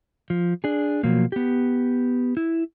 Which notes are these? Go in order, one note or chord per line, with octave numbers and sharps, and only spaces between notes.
F3
D4 G#4
B2 F3 F#3 A#3
B3 G4
E4